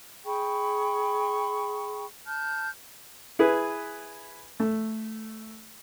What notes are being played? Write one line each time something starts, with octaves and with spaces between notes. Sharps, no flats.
G#4 G5 B5 C#6
A5 F6 G6
E4 G#4 B4
A3